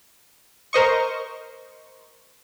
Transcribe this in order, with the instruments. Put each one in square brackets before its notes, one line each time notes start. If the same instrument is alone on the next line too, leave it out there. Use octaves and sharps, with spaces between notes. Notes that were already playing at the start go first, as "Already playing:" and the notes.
[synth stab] A#4 C5 D#5 C#6